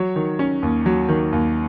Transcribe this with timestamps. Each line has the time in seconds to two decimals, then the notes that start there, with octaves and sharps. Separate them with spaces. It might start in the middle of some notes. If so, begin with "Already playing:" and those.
Already playing: F#3 C#5
0.16 D#3
0.39 C#4
0.63 D#2
0.86 F#3
1.09 D#3
1.32 D#2